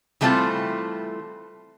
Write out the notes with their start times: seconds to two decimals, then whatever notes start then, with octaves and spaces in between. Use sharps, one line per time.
0.21 E3 G3 A3 C4 F4 C5